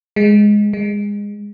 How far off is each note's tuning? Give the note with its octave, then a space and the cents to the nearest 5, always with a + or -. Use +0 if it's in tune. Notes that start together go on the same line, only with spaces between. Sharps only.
G#3 +0
G#3 -25